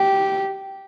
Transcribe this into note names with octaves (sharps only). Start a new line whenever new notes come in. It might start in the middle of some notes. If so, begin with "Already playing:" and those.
Already playing: G4